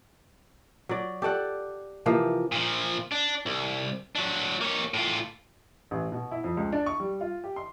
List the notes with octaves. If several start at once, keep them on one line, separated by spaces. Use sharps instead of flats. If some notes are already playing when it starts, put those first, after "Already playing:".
F#3 D5
G4 A4 D5 F#5
C3 E3 F3 A#3
A#2 F3
D4
C2
F#3 D4
A#3 C#5
A2 F4
A1
B2
E4
F2
C#2
D4
C#6
G3
F4
G4
C6